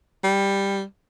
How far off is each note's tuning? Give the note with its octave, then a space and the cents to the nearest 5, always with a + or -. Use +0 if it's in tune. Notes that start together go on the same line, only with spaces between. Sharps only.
G3 +10